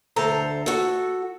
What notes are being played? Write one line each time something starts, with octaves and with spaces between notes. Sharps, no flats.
D2 A4 C5 A#5
F#4 A4